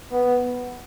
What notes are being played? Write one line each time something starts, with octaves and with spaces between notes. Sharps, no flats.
B3